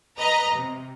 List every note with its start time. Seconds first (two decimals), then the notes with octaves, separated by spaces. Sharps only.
0.19 B4 D#5 A#5
0.55 C3